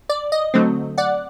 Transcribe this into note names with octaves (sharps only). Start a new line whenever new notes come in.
D5
D#5
D3 F#3 A3 C4
D5 F#5